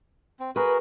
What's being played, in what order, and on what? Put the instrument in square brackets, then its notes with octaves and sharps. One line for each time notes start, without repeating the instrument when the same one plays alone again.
[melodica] C4
[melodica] F#4 G#4 A#4 [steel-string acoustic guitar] B4